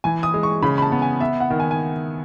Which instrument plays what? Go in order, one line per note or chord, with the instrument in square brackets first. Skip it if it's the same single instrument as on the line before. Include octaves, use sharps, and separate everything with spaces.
[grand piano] E3 [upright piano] G#5
[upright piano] D#6
[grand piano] G#3
[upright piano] C#6
[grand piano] C#3 [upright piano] B5
[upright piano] B5
A5
[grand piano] B3
[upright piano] G#5
[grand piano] B3 [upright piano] E5
[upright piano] F#5
[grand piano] D#3
[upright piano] G#5
G#5